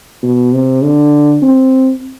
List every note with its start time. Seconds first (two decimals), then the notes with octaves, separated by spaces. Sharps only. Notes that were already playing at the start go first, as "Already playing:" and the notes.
0.23 B2
0.53 C3
0.83 D3
1.42 C4